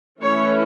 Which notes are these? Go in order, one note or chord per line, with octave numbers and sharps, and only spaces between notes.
E3 A3 C#4 E4 C#5